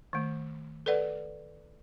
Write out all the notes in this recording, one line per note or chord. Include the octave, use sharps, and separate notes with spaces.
D#3 A3
A4 B4 D5 F#5